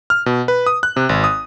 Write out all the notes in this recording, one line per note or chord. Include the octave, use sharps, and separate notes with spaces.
F6
B2
B4
D#6
F#6
C3
G#1
D#6